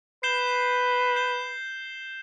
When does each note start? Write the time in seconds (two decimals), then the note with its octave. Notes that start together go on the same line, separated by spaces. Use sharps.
0.23 B4 G6 C7 E7 G7
1.16 G6 C7 E7 G7